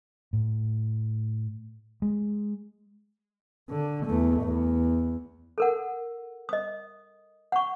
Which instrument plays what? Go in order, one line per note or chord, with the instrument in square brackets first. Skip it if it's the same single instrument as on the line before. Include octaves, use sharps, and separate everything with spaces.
[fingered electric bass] A2
G#3
[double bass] D3
E2 A3
E2
[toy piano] A4 A#4 F#5
D#5 D#6
F#5 C#6